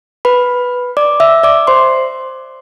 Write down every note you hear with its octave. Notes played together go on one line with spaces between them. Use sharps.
B4 B5
D5 D6
E5 E6
D5 D6
C5 C6